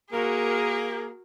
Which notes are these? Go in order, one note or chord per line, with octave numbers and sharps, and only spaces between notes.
A#3 F#4 G#4 A#4